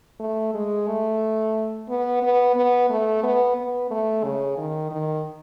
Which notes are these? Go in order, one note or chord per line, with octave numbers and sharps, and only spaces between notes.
A3
G#3
A3
B3
B3
B3
A3
B3
B3
A3
C#3
D#3
D#3